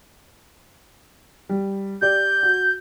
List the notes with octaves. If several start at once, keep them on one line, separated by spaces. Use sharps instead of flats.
G3
G4 D5 G6
F#4